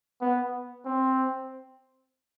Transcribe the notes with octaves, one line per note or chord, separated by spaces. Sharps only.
B3
C4